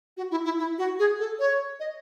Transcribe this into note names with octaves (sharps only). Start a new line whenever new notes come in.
F#4
E4
E4
E4
F#4
G#4
A4
C#5
D#5